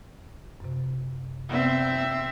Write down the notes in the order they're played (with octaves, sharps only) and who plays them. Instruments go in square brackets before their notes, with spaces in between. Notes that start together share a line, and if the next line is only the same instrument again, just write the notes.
[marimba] F#2 C3
[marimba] C3 B3 D5 [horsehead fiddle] C4 E5